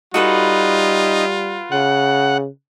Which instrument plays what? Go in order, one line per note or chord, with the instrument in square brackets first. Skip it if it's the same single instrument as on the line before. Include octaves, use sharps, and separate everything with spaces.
[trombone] G3 [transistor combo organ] D#4 [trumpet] F4 [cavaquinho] F#4 A4 B4
[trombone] C#3 [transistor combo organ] F#5